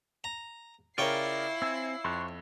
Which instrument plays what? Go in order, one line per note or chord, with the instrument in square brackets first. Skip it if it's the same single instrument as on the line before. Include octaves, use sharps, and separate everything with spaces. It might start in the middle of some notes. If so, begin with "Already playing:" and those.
[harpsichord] A#5
[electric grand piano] C#3 A#4 [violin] E4 C7 [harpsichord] F4 C#5 G5 [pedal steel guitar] D5
[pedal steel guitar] C4 G#5 [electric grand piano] E6
[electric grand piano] F2 [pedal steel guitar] C6 C#6 F#6